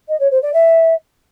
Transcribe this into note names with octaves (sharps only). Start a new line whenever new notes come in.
D#5
C#5
C5
D5
E5